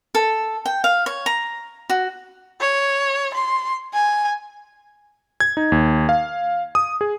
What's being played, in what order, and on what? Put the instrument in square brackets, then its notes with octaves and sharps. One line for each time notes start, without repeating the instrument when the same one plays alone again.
[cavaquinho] A4
G5
F5
C#5
A#5
F#4
[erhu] C#5
C6
G#5
[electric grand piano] G#6
D#4
D#2
F5
D#6
G#4